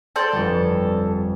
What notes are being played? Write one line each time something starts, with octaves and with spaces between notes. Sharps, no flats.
A4 C5 D5
G1 F2